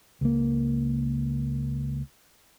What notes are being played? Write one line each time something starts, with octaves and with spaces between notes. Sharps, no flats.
C#2 A#3